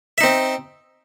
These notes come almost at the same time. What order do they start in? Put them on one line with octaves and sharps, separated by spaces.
E5 D#4 C4